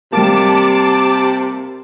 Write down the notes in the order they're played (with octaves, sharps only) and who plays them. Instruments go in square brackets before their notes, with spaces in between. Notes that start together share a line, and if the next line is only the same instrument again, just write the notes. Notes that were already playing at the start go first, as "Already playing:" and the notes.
[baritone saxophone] C3 [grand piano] G3 A#3 [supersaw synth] A5 D6